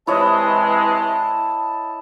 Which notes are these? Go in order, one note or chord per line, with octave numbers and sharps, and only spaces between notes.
C3 E3 G#3 E4 C#5 D#5 A5